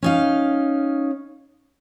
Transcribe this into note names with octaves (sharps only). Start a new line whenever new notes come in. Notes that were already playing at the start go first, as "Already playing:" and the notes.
C#4 D#4 F5